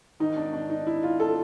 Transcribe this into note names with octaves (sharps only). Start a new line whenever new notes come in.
G#2 D#3 D#4
D4
D4
D#4
E4
F4
A4